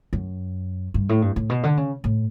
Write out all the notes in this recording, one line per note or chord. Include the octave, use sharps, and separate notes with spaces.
F#2
G2
A2
G2
A2
B2
D3
C#3
A2